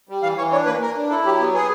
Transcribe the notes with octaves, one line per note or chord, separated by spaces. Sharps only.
G3
E3 F5
E3 C#5
D4 C#5
A#3 B4
A#3 A#4
D4
E4 A4
F#3 G4
B3 G4
B3 G#4